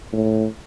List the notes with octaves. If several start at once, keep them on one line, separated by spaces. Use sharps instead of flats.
A2